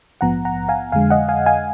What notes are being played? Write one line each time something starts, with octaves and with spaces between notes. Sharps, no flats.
A#1 G#2 F3 B3 F#5 A#5
F#5 A#5
F5 G#5
F2 D3 G#3 F5 G#5
D#5 F#5
F5 G#5
F5 G#5